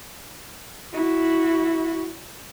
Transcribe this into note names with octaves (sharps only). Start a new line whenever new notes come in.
E4 F#4